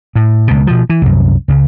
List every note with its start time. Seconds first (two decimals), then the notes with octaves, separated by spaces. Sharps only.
0.15 A2
0.47 C#2 B2
0.67 B2 F3
0.90 E3
1.02 C2 F#2
1.48 C#2 C#3